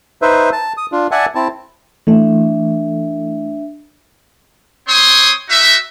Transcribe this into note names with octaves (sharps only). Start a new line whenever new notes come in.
D#4 B4 C5 E5
A5
D#6
D4 F4
D5 E5 F#5 G#5 A5
C4 E4 A5
E3 A3 D4 E5
C4 C#5 C6 D#6
D#4 F#4 E5